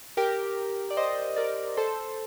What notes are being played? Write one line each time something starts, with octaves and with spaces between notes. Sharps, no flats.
G4 A#4
D5
C5 D#5
A#4 D5
A4 C5